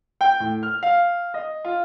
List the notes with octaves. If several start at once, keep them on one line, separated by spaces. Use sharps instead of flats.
G5
A2
F6
F5
D#5
F4